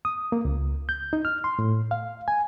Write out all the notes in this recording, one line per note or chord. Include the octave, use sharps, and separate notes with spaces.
D#6
A#3
C#2
G6
D#4
F6
C6
A2
F5
G#5